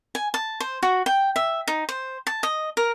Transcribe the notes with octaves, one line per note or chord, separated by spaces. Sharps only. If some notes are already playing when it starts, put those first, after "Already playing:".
G#5
A5
C5
F#4
G5
E5
D#4
C5
A5
D#5
A#4